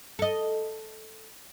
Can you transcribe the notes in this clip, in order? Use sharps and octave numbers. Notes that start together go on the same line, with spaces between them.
A4 D#5